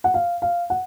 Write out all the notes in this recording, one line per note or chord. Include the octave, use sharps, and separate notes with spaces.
F#5
F5
F5
F#5